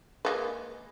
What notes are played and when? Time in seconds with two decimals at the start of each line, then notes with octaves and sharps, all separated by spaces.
0.25 G#3 A#3 B4